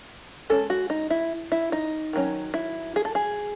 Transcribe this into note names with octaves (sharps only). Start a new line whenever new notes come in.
G#3 C#4 A4
F#4
D#4
E4
E4
D#4
D#3 F#3 C#4
E4
G#4
A4
G#4